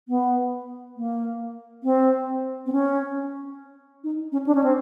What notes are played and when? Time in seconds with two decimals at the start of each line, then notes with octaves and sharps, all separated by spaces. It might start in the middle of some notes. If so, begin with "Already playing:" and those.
0.08 B3
0.97 A#3
1.84 C4
2.66 C4
2.72 C#4
4.04 D#4
4.32 C#4
4.46 D4
4.55 C#4
4.64 C4